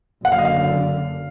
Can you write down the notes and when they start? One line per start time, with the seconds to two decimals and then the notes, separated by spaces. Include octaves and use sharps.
0.25 F#1 F#2 D3 F#5
0.32 F5
0.38 D#5
0.45 F5